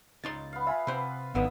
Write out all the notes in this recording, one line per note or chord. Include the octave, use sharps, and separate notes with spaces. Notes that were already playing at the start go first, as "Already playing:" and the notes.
C#2 D#4 C6 A6
B3 F5
F4 E5 G#5 B5
C3 B4 C5
G#1 F#2 D3 D#3 B3 E5 D#6